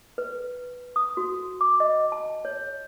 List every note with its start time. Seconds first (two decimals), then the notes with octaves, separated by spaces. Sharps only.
0.18 B4
0.96 D#6
1.17 F#4
1.61 D6
1.80 D#5
2.12 A5
2.45 C#5